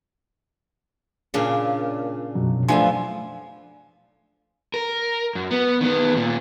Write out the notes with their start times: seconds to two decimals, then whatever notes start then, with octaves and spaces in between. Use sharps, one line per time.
1.34 A#2 C#3 D4
2.35 F#2 B2 F#3
2.68 F3 A3 B3 D4 E5 G#5 C6
4.74 A#4
5.35 F#2
5.51 B3
5.81 D#3 B3
6.13 D#2 A#2